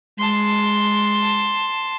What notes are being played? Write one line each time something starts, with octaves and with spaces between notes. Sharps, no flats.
G#3 A5 C6